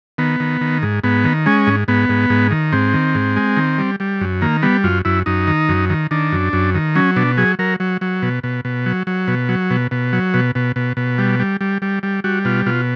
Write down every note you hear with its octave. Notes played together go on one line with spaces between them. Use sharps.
D#3 B3
D#3
D#3
G#2
G#2 B3
D#3
G#3 C#4
G#2
G#2 B3
G#2
G#2
D#3
G#2 C4
D#3
G#2
G#3
D#3
G3
G3
F#2
D#3 A#3
G3 B3
F#2 F4
F#2 E4
F#2 D#4
D#3
F#2
D#3
D#3 D4
F#2
F#2
D#3
F#3 C#4
B2 D4
F#3 G#4
F#3 A#4
F#3
F#3
B2
B2
B2
F#3
F#3
B2
F#3
B2
B2
F#3
B2
B2
B2
B2
G3
G3
G3
G3
G3
G3 F#4
B2 F4
B2 F4